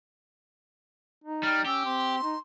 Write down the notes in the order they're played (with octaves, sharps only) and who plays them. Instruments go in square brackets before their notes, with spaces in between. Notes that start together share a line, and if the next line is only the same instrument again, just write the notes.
[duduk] D#4
[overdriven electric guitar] G3 [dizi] F6
[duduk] C#4 [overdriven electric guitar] G4 [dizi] E6
[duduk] C4 [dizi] C6
[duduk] D#4